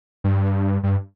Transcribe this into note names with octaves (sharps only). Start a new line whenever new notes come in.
G2
G2